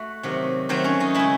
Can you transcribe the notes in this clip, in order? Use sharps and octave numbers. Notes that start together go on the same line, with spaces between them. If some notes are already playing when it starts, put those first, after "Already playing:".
Already playing: A3 F#4
C3 D#3 F#3
D#3 F#3 A3 C4 C5
C#4 C#5
D#4 D#5
C#3 G#3 E4 E5